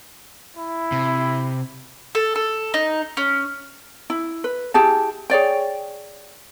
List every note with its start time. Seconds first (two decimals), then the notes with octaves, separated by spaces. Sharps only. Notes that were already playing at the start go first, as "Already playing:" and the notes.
0.57 E4
0.92 C3
2.15 A4
2.36 A4
2.74 D#4
3.17 C#4
4.10 E4
4.44 B4
4.74 E4 G4 G#4 A5
5.30 G#4 C#5 D5 G5